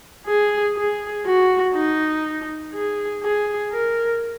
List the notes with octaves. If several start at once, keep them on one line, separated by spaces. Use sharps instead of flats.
G#4
G#4
F#4
D#4
G#4
G#4
A#4